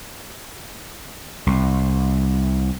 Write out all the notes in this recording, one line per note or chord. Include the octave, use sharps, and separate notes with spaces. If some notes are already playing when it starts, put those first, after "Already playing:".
C2